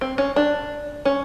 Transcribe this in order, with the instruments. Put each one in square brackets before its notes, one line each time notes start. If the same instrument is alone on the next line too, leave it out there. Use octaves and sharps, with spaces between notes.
[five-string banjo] C4
C#4
D4
C#4